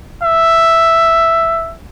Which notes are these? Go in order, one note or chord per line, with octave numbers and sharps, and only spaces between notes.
E5